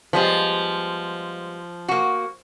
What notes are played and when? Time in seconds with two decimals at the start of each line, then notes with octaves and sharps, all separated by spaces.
0.13 F3 G3 G#3 B3
1.88 A#3 F#4